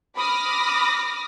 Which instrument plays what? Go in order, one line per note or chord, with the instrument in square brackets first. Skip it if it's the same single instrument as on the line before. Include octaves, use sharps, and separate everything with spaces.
[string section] B5 D6 D#6 F6 A#6